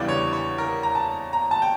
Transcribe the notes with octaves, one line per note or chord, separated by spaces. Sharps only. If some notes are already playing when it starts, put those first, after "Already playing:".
Already playing: E2 C#3 E3 G3 D4 D5
C#5
C#5
A#4
A#5
A5
A#5
A5
G5